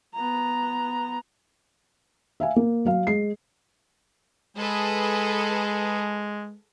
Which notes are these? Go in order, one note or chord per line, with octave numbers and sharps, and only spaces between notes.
B3 A#5
E5 F5 G#5
A#3
F#3 F5
G#3 C7
G#3 G#4 A4 B4